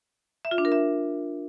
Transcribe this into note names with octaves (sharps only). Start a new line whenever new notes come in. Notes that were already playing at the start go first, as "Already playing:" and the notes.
E5
F4
D4
A#4
E5